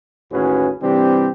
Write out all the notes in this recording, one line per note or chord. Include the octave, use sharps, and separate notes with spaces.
A1 D#2 C#4 F#4 G#4 B4
C3 E3 G3 C4 D4 G4